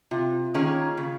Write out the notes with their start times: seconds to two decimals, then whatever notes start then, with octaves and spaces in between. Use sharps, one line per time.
0.11 C3 F4
0.54 D#3 A#3 C#4 G#4
0.97 C#3